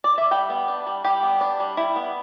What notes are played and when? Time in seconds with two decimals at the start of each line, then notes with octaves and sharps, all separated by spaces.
0.04 D5
0.18 E5
0.31 G3 G5
0.50 B3
0.68 D4
0.87 G3
1.04 G3 G4
1.23 B3
1.41 D4
1.60 G3
1.77 G3 E4
1.96 B3